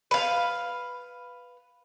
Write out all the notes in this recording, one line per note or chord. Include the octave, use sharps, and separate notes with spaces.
B4 F5